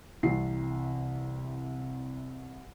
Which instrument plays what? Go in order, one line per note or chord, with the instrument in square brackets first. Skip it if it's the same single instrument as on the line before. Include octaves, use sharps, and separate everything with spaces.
[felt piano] C2 C3 E3 C7